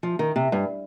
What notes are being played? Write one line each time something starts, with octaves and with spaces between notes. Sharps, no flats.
F3
D#3
C3
G2